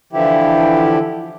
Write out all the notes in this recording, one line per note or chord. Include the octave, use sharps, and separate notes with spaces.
D3 E3 F3 E4 G4